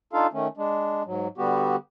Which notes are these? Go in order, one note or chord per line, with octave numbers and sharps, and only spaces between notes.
D4 D#4 F4 A4 F5
D#3 A3 C#4
G#3 D4
G#2 F#3
D3 G3 B3 F#4 G4